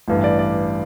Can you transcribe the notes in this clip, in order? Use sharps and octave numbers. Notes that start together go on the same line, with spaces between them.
A1 G2 E3
D5
D5